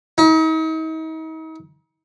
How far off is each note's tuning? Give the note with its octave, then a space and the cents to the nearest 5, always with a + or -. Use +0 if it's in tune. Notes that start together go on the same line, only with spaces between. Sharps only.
D#4 +40